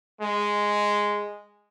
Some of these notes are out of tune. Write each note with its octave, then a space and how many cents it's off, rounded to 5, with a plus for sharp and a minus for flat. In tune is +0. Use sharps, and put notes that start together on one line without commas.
G#3 -5